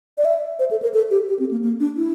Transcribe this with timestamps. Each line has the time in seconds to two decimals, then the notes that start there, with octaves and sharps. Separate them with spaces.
0.18 D5
0.25 E5
0.59 C5
0.71 A4
0.82 A#4
0.94 A4
1.10 G4
1.28 G4
1.39 C4
1.51 A#3
1.63 A#3
1.80 D4
1.97 E4